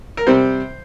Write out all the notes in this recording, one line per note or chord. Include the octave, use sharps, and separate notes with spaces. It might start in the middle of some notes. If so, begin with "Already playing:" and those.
A#4
C3 G3 C4 C5